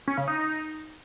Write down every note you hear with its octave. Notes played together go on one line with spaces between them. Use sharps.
C#4
C#3
D#4
D#4